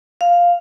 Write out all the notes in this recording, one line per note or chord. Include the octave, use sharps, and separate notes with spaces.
F5